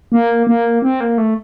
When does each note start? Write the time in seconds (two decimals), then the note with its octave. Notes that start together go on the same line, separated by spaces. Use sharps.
0.12 A#3
0.47 A#3
0.82 C4
1.00 A#3
1.18 A3